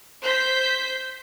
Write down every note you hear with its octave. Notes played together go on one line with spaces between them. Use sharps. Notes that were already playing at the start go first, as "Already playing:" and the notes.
C5 G6 B6